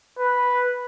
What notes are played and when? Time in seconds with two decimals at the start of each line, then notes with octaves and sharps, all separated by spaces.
0.19 B4